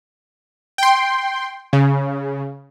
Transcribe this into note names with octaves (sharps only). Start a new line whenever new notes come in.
G5 C6
C#3